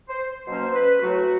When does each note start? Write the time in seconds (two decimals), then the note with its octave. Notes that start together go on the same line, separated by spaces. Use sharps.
0.09 C5
0.46 B2 F#3 A#3 C#4 C5
0.74 B4
1.01 A2 F#3 A3 C#4 F#4